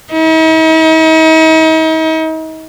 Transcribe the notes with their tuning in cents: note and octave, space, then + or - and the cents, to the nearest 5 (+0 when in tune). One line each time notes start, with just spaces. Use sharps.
D#4 +45